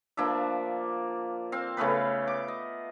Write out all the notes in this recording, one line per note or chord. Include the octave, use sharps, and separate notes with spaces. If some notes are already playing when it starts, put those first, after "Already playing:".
F3 A#3 D4 E5
C4 F5
C#3 A3 B3 B4
D6
D#5